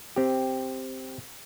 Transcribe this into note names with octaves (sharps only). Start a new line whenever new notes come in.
C4 G4